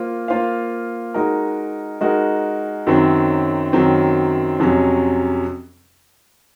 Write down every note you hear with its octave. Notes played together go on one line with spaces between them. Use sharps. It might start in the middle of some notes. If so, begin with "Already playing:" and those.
Already playing: A#3 F4 C5
A#3 F4 C5 F5
G#3 D#4 F#4 A#4
G#3 D#4 F#4 A#4
F#2 D#3 F#3 C4
F#2 D#3 F#3 C4
F2 C3 F#3 C#4